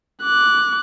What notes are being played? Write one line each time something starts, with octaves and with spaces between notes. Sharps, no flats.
D6 F#6